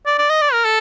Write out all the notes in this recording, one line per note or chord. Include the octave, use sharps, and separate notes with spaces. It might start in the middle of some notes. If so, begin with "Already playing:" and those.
D5
D5
D#5
D5
A#4
A4